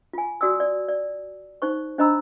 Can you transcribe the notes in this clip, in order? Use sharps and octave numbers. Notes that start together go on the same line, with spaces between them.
F4 G#5
F#4 D5 G#5 D#6 E6
D5
D5
D#4 C5 C#6
D4 C5 D#5 A#5 B5 E6